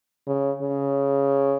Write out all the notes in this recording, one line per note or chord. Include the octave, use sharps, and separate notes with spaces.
C#3
C#3